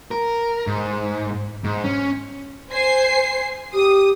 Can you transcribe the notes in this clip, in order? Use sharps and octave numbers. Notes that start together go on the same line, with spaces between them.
A#4
G#2
G#2
C#4
C5 G#5 C7
G4 D#6